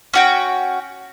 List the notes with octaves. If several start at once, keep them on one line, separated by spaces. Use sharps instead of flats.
C#4 F#4 G5